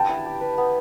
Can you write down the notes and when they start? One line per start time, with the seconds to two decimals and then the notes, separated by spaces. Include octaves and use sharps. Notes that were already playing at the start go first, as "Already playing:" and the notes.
Already playing: B3 G4 B4 G5 A5
0.09 E4
0.26 G4
0.41 B4
0.58 B3